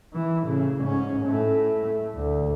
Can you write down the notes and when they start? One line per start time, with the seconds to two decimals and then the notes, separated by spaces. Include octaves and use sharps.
0.13 E3
0.43 A2 C#3
0.83 G#2 C#4
1.23 A2 A3
2.15 D2